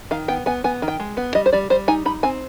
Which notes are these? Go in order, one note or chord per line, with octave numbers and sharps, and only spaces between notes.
D#3 F5
B3 G5
B3 G#5
B3 G#5
D#3
G5
G#3
B3
G3 D#5
C5
G3 D5
G3 C5
D#4 G#5
D#4 B5
C4 G#5